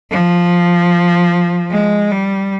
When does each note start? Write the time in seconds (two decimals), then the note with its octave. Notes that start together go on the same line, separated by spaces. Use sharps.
0.10 F3
1.71 G#3
2.11 G3